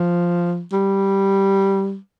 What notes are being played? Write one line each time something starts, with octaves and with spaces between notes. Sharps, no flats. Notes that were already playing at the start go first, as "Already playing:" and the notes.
Already playing: F3
G3